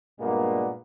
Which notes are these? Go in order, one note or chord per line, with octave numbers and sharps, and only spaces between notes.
G2 A#2 G#3 A#3 B3